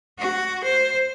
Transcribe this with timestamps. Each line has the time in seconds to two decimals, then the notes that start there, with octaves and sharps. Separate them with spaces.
0.19 F#4
0.63 C5